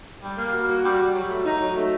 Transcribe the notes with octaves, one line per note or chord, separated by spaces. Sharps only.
G3
A#3
F#4
F#4
G3
G3
F#3
A3
D#4
F#3
A3